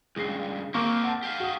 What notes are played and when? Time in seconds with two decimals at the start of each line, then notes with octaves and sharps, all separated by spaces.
0.16 C#2 G2 G#3 A#6 C7
0.74 A#3 C4 A#4 C#6
1.03 F#5 A5
1.23 G4 F5
1.40 F#4 D#6